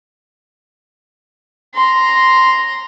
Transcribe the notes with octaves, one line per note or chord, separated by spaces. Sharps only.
A#5 C6